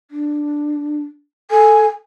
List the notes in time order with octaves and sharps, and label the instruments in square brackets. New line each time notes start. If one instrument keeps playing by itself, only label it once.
[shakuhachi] D4
[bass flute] A4 [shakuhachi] G#5